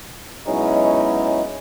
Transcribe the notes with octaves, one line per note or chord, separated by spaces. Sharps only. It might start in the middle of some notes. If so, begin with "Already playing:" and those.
B2 F#3 G#3 C#4 D#4 E4